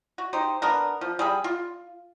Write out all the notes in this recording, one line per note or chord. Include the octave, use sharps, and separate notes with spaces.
F#4
D#4 G4 C5
B3 D4 A#4
F3
G3 G#4 B5
F4